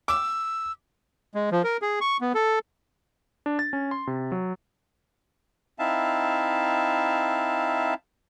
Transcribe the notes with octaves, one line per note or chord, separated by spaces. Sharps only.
D6 E6
G#3
F3
A#4
G#4
C#6
B3
A4
D4
A6
C#4
C6
C3
F#3
C4 D#4 E4 E5 F5 A5